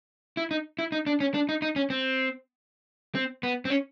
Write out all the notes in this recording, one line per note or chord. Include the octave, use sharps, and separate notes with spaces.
E4
D#4
E4
D#4
D4
C#4
D4
D#4
D#4
C#4
C4
C4
B3
C4
C#4